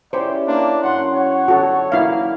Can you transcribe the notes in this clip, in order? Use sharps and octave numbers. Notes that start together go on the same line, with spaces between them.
C#4 E4 G4 G#4 C5 D5
A#3 D4
F#2 F#5 C6
C#5 F#5
D3 F#4 A4
A#3 E4 F5